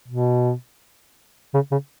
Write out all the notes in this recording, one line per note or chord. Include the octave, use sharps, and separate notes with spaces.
B2
C#3
C#3